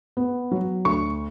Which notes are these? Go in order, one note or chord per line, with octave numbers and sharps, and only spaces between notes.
B3
F#3
D2 C#6